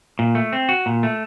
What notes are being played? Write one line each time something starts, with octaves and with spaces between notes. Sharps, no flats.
A#2
A3
C4
F#4
A#2
A3